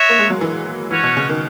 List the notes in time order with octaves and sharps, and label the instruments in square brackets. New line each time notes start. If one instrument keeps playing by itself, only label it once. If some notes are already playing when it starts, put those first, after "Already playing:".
Already playing: [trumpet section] F#4 C#5 E5
[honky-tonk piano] A#3
G#3
F#3
E3
[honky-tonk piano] E3 [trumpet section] C#4 F#4 C#5
[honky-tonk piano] B2
C#3
D#3